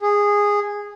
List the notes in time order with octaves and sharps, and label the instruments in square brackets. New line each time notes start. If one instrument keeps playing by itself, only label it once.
[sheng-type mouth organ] G#4